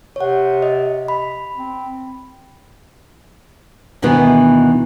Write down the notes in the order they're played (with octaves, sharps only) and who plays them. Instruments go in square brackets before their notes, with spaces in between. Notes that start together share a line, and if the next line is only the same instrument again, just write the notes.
[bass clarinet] C3 [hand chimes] C#5 F#5
[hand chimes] D#5
B5
[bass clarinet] C4
[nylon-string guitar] D2 B2 D#3 E3 B3